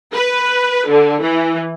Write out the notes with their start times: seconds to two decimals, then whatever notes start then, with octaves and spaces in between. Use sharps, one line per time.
0.14 B4
0.88 D3
1.22 E3